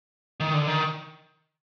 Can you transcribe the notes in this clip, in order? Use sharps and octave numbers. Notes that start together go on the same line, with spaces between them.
D#3
D3
D#3